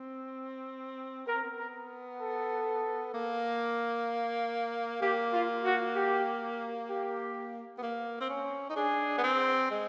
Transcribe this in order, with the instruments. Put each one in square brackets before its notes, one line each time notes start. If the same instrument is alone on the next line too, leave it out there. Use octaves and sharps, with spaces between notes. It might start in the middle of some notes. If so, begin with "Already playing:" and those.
Already playing: [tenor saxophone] C4
[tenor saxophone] B3 [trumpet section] A#4
[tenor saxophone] C4
B3
[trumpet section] A#4
A4
[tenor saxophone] A#3
[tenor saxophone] A#3 [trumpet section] G4
[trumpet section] F4
F#4
G4
G4
[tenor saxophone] B3
A#3
C4
C#4
D#4
[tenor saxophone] D4 [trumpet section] G#4
[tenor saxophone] B3
C4
G#3